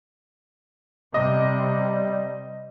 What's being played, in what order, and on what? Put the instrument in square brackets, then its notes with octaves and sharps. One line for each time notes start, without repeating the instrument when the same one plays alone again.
[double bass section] C3 [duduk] G3 [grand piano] D#5